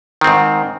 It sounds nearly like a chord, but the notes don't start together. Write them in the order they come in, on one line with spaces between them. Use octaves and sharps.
D#3 C4 G#2